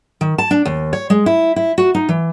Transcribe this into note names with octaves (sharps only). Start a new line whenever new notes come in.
D#3
A5
D4
D#2
C#5
G#3
E4
E4
F#4
D#4
E3